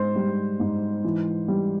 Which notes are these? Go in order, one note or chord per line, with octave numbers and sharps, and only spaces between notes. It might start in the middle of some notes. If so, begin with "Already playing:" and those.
Already playing: G#2 C5
G3
G#2
E3
G3